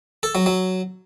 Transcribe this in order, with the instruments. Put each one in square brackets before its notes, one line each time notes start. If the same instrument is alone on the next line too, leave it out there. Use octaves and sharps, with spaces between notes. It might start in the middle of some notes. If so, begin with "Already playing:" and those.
[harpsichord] A4
F#3
F#3